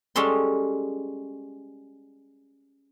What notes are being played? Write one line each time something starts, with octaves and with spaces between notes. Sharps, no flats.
G3 G#3 C#4 A4 C6